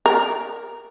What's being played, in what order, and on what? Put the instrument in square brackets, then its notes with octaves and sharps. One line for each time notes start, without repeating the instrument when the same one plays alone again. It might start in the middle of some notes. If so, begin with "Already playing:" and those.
[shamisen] A#4